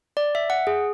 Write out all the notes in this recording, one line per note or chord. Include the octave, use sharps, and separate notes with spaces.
D5
E5
F#5
G#4